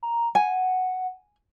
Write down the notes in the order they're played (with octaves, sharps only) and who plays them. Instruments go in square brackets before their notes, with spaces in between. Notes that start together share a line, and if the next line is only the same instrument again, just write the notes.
[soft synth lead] A#5
[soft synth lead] F#5 [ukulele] G#5